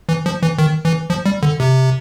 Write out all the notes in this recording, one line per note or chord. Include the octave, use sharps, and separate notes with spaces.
E3
F3
E3
D#3
E3
F3
G3
D3
C3